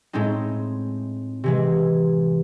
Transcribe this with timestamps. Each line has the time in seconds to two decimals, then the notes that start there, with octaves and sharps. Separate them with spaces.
0.13 A2 G#3 C4 D#4
1.44 C3 E3 G#3